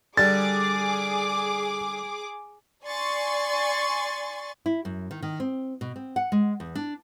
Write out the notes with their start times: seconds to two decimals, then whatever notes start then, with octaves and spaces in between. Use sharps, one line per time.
0.18 D3 G3 G#4 D6 A6
2.84 D5 G#5 C6 C#6 A6
4.66 E4
4.85 F#2
5.11 D#3
5.22 D#3
5.40 C4
5.81 B2
5.96 C4
6.16 F#5
6.32 G#3
6.60 E2
6.75 D4